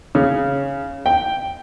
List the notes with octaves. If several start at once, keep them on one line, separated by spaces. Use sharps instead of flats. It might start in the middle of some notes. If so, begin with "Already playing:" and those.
C#3
G5